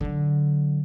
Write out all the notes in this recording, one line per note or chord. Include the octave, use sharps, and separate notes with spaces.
D3 F#3